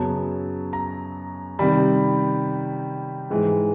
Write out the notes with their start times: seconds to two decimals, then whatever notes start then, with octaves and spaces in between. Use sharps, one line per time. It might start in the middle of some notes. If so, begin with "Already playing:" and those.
Already playing: F#2 C#3 F#3 B3 A5
0.73 A#5
1.59 C3 D#3 G3 B5
3.30 G#2 E3 G#3